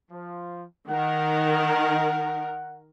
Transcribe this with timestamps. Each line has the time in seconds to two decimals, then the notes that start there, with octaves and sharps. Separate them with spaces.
0.11 F3
0.89 D#3 A#4 F#5